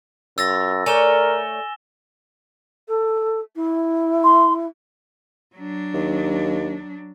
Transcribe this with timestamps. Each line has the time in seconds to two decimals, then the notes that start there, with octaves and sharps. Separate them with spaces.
0.38 F#2 F4 E6 A6 A#6
0.86 A3 A#4 C#5 D5 G#5 E7 G7
2.88 A4
3.56 E4
4.24 C6
5.55 F#3 D4
5.94 D#2